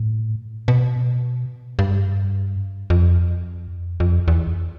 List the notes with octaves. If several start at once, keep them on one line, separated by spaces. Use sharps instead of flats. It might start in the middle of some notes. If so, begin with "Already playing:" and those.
Already playing: A2
B2
G2
F2
F2
E2